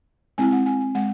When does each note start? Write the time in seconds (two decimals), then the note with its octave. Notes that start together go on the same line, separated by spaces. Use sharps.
0.38 G#3 C4 E4 G#5
0.52 F#5
0.66 G#5
0.81 G#5
0.95 G#3 C4 F#5